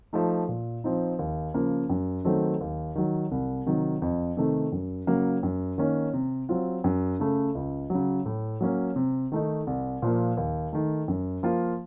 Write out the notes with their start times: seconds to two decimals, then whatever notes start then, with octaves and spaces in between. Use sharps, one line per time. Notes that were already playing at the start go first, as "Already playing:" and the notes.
0.13 F3 A3 D#4
0.49 A#2
0.84 F3 C4 D#4
1.19 D#2
1.54 C#3 F3 A#3
1.90 F#2
2.25 D#3 F#3 A3 C4
2.61 D#2
2.95 D#3 F#3
3.31 C2
3.66 C3 D#3 F#3
4.02 F2
4.37 C3 D#3 A3
4.72 F#2
5.07 C#3 F#3 A#3
5.43 F#2
5.78 D#3 A#3 C#4
6.13 C3
6.49 F#3 C4 F4
6.84 F#2
7.20 C#3 A3
7.55 C#2
7.90 C#3 F#3
8.26 A2
8.61 F#3 A#3 C#4
8.96 C3
9.32 D#3 A3 D#4
9.67 C2
10.02 A#2 F3 A#3
10.37 D#2
10.73 D#3 A3
11.08 F#2
11.43 F3 A#3 F4